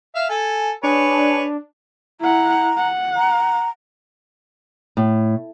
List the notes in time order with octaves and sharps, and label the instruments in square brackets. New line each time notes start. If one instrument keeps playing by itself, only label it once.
[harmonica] E5 F5
A4 G#5
[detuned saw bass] D4 [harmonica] G#4 B4 C#5
[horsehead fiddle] E4 F#5 [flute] A#5
[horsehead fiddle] F#5
[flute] A#5
[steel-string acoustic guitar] A2